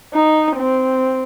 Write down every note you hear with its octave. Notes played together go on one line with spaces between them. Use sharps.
D#4
C4